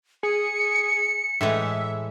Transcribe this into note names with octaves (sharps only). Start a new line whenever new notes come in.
G#4 C#7
A2 E3 G#3 E5